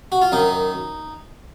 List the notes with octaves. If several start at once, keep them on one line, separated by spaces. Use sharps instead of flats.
F#4
F4
F#2 D#3 D#4